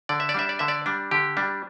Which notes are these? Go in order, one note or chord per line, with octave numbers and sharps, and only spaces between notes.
D3 D5
E5
D5
G3 D4 E5
D5
D3 E5
D5
G3 D4
D3 G4
G3 D4